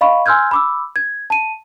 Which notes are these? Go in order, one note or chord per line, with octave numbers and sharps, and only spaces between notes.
D#5 F5 B5 C#6
G#5 C6 E6 F6 G6 G#6
B5 D6 E6
G#6
A5 D#7